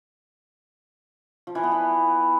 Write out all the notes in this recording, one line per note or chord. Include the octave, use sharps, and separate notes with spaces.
F3
E3
B3
E4